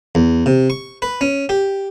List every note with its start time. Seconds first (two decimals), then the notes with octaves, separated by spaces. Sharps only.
0.15 E2
0.46 C3
0.70 C#6
1.02 B4
1.21 C#4
1.49 G4